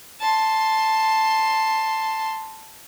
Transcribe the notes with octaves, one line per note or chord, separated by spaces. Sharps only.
A5 C6